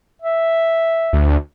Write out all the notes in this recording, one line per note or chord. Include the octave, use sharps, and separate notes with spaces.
E5
D2